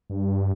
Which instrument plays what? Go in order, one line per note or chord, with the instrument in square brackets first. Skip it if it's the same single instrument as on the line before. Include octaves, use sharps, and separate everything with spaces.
[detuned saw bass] G2